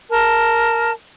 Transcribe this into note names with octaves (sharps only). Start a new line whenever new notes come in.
A#4 A5